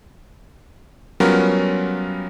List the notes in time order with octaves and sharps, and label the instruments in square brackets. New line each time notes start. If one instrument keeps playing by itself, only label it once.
[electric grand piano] F#3 G3 B3 C#4 F4 A#4